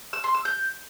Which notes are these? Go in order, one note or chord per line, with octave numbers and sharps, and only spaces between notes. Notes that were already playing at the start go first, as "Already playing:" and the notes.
E6
C6
E6
G6